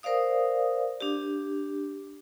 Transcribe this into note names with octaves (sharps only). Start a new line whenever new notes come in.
A#4 C5 D5 F5 D#6
D4 G4